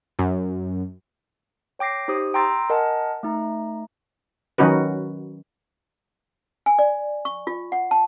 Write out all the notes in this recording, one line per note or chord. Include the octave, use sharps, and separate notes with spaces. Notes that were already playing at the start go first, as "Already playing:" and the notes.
F#2
C#5 G5 D6 A#6 C7
D#4 G4 C5 D#6
G5 A#5 C6 E6 A6
A#4 D#5 F#5 G#5 A5
A3 D#4 A#5
D#3 F#3 C#4 D#4 F#4 B4
G#5
D5
C#6
F4
F#5
A5